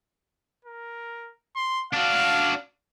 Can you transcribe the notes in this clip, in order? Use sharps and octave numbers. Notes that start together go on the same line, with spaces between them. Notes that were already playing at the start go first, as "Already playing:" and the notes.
A#4
C6
D4 F#4 F5